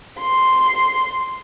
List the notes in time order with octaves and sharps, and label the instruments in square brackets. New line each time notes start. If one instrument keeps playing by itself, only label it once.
[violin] C6